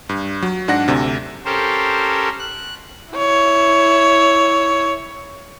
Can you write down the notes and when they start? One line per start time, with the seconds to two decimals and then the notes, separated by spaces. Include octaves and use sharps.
0.09 G2
0.42 F#3
0.68 G#2 D4 F#5 A#6
0.88 D2 C3
1.45 C#4 G4 A4 A#4 C5
2.39 F#6
3.14 E4 C#5